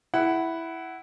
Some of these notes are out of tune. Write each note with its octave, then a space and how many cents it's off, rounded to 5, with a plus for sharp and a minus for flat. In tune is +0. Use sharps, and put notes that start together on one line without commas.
E4 +0 F#5 +15